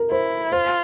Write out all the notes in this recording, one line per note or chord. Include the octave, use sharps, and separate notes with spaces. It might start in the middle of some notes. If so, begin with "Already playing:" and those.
Already playing: A#4
E4 C5
F4 C5